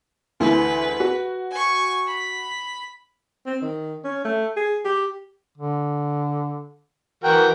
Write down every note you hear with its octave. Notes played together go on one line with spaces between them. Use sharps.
D2 E3 G#4 B4
F#4
G#5 C#6
B5
C4
D#3
C#4
A3
G#4
G4
D3
E3 F#4 A#4 G5